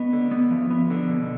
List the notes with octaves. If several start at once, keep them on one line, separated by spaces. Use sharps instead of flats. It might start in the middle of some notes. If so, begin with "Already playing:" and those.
Already playing: B3 D#5
D3
B3
F3
B3
D3
B2